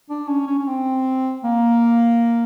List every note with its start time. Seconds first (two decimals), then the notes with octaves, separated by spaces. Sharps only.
0.10 D4
0.28 C#4
0.47 C#4
0.59 C#4
0.68 C4
1.44 A#3